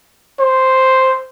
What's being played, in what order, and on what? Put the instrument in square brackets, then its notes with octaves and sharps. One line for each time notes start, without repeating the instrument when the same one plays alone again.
[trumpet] C5